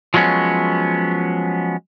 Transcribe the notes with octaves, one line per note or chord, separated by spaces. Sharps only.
F3 F#3 G#3 B3 C#4